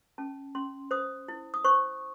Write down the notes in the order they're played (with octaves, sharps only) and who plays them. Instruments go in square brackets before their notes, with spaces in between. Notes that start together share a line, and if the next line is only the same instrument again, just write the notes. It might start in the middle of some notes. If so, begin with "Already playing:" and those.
[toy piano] C#4 A5
C#4 C6
C5 D#6
E4
D#6
C5 C#6